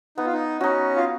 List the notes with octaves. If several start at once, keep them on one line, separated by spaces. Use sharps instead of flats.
B3 D#4
F4
D#4
C#4 D#4 F#4
F4